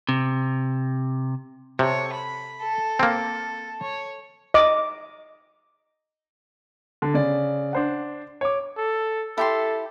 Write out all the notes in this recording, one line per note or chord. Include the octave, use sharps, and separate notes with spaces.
C3
C3 A4 C#5
B5
A4
A#3 C4
C#5
D#5 D6
D3 A5
C#3 D5
D4 C5 F#5
C#5 D6
A4
E4 G4 A4 C6